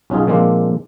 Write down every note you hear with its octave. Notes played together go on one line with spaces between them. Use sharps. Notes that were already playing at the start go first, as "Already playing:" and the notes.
B1 C#4 D#4 F4 G#4
A#2 F3 G#3 A#3 C4 D4